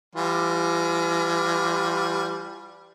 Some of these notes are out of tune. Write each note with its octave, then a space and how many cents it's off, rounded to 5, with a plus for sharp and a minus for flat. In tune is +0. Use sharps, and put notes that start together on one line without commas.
E3 +40 G3 +0 F4 +30